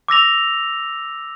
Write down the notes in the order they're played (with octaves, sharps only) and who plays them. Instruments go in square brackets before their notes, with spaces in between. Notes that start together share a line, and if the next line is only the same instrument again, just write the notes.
[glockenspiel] D6 E6 A#6 F7